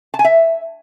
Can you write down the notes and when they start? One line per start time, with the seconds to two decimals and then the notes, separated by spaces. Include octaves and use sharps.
0.14 A5
0.19 G#5
0.25 E5